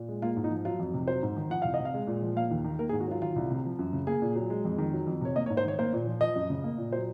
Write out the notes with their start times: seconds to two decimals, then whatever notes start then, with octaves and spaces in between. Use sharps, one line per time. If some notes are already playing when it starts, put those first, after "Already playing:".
Already playing: A#2
0.08 G#3
0.22 A#3 F4
0.37 G#2
0.44 D#4
0.50 F3
0.65 F#3 F4
0.79 F2
0.94 C3
1.08 F#3 C5
1.23 G#2
1.37 D#3
1.50 F3 F#5
1.62 C2 F5
1.74 D#5
1.79 C3
1.85 F5
1.94 G#3
2.07 A#2
2.22 F3
2.36 A#3 F5
2.51 D#2
2.64 D#3
2.79 A#3 A#4
2.89 G#4
2.93 G#2
3.00 F#4
3.08 F#3 F4
3.22 D#3 F4
3.36 C2
3.51 C3
3.65 F3
3.79 F#2
3.93 C#3
4.07 A#3 G#4
4.22 A#2
4.36 F#3
4.50 G#3
4.65 F2
4.78 D#3
4.93 F#3
5.07 F2
5.21 C3 C#5
5.36 A#3 D#5
5.46 C#5
5.50 G#2
5.57 C5
5.65 D#3 C#5
5.79 A#3 C5
5.93 A#2
6.07 F3
6.21 F3 D#5
6.36 F#2
6.50 C#3
6.64 A#3
6.78 A#2
6.92 F#3 C5